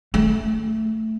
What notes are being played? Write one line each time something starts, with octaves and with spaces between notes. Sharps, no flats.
A3